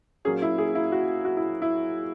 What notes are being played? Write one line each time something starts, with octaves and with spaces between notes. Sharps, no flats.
A#2 F#3 A#3 C#4 G#4
E4
G#4
E4
F#4
F#4
E4
E4